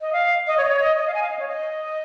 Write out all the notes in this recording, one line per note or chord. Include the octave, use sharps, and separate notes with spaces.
D#5
F5
D#5
C#5
D#5
C#5
D#5
D#5
F5
G#5
F5
D#5
C#5
D#5